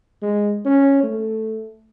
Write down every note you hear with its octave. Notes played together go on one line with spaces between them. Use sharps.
G#3
C#4
A3